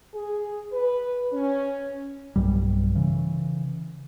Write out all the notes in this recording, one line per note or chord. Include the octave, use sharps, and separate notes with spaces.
G#4
B4
C#4
B1 G2 G3
C#3 E3